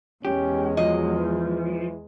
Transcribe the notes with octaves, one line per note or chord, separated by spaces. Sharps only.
E2 G#3 C#4 G4
F3 F#3 D#5
E3